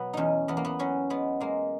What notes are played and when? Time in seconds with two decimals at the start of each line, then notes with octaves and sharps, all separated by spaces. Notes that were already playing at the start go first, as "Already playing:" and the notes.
Already playing: B2 F#3 B3
0.13 E2 C#4 D#4
0.48 E2 B3
0.57 A#3
0.65 B3
0.79 F#3 C#4
1.10 G#3 B3
1.40 G#3 A#3